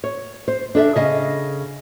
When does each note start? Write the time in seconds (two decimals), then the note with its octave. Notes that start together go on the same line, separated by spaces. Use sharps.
0.04 C#5
0.48 C5
0.75 D4 A4 D#5 E5
0.96 C#3 D#5 F5